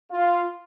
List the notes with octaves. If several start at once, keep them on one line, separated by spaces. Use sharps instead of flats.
F4